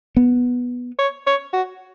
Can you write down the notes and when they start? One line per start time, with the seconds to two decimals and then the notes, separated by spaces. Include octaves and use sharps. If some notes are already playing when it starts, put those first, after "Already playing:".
0.17 B3
0.99 C#5
1.27 C#5
1.53 F#4